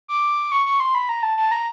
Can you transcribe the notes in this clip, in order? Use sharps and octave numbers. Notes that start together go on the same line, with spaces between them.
D6
C#6
C#6
C6
B5
A#5
A5
A5
A#5